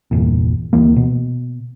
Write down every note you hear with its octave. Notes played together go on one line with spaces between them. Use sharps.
G1 E2 A#2
D2 E3 A#3
B2